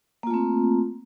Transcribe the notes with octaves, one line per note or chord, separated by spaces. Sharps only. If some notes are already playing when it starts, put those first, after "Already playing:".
A3 A#3 C4 F4